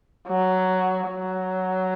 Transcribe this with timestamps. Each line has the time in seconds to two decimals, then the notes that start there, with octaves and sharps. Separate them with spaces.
0.27 F#3
1.08 F#3